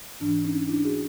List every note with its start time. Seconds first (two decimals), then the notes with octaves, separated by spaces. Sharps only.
0.20 G#2 E3 D4
0.44 C#4 D#4
0.69 D4 E4
0.85 F#4 G#4